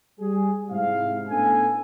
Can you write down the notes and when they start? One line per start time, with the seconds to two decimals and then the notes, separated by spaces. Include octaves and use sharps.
0.20 G3 G#4
0.71 G#2 C3 E4 F5
1.29 A2 B3 C#4 D4 A4 G#5